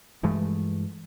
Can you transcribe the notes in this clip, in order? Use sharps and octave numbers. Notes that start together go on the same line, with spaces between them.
G2 E3 G#3 A3